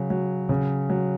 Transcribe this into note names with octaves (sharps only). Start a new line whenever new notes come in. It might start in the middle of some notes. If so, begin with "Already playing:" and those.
Already playing: C#3 F#3
F#3
C#3
F#3